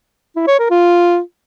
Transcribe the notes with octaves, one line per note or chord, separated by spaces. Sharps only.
E4
C#5
A#4
F4